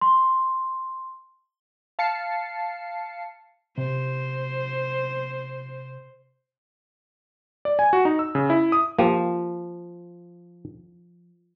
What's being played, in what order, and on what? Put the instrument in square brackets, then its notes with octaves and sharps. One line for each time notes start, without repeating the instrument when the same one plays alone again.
[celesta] C6
[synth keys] F5 A5 C7 C#7
[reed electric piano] C3 [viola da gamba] C5
[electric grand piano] D5
G#5
F#4
D#4
E6
C#3
E4
D#6
[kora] F3 [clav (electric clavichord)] A#3 G4